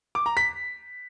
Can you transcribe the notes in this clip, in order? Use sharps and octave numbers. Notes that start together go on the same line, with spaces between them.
D6
A#5
B6